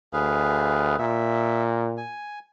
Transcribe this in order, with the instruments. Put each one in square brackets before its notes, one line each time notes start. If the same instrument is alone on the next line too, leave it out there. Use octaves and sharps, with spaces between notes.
[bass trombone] D2 [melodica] G#4 B4 F5
[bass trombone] A#2 [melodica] E5
[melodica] G#5